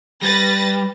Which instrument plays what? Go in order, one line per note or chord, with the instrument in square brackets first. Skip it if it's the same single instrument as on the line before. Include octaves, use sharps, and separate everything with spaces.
[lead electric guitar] G3 [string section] B4 A6 A#6